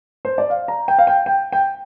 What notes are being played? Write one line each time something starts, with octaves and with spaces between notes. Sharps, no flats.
C5
D5
F5
A#5
G5
F5
G5
G5
G5